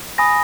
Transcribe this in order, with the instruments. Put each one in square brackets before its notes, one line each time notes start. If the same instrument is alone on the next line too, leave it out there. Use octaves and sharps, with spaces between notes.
[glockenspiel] G#5 B5 D#6 A#6